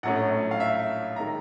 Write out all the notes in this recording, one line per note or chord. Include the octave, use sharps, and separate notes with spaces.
A#1 A2 F#3 A3 C#4 F#5
F5
E5
D#3 G#3 A#5